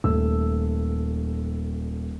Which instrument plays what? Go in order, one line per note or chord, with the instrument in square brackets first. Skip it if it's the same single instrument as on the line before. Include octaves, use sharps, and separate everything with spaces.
[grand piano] D#1 A3 E6